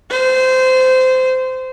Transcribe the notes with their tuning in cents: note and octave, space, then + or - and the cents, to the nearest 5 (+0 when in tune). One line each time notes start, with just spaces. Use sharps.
C5 -20